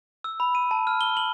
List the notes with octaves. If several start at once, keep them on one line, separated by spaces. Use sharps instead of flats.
E6
B5
D#7
A5
F6
G7
F#7